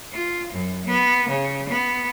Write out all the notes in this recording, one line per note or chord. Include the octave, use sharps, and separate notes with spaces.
F4
F#2
B3
C#3
B3